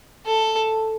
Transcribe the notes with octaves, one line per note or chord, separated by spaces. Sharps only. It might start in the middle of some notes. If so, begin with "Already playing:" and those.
A4